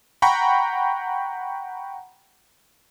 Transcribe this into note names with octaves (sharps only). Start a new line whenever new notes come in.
F#5 G5 A#5 B5 C#6